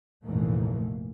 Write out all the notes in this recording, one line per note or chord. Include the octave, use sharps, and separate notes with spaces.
F1 A#1 G#2 E3 A3 A#3